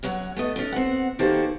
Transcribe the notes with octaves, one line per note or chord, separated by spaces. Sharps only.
F#2 F#3 C#5 F#5
A3 B3 D#5
C#4 D4
C4 F#5
D#3 A#3 F#4 G4 A4 C5